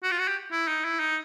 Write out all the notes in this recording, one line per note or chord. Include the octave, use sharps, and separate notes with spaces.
F#4
F4
F#4
G4
E4
D#4
E4
D#4